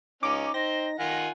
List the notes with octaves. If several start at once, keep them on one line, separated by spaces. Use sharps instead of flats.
C#2 C#4 D#4 D6
D#4 C5 G5 A#6
D#3 F4 F#5 G#5